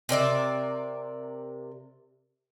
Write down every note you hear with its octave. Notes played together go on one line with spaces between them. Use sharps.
C3 A#4 D5 E5